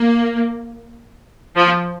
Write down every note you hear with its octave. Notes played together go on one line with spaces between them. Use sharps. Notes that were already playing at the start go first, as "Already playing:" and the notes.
Already playing: A#3
F3